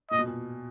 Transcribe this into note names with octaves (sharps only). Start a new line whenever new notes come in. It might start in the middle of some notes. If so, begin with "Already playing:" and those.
A#2 D#5
B2
A#2